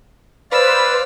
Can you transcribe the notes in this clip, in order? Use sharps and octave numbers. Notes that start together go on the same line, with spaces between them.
B4 C5 D5 F5 E6